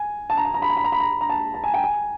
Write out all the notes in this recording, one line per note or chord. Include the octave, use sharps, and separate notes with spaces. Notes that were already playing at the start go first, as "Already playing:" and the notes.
Already playing: G#5
A5
A#5
A5
A#5
B5
A#5
B5
A#5
B5
A#5
A#5
A5
A5
G#5
G5
G#5